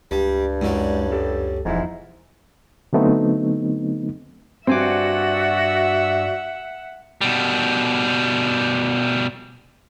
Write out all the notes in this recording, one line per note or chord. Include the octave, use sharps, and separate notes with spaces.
C#2 G2 G3
F#2 F#3 G#3 E4 D5
G4 A4
E1 E2 G#2 F3 E4
D3 F#3 A3 B3 C4 D#4
G2 C4 F#4 D5 E5 F#5 G#5 D6
B2 G3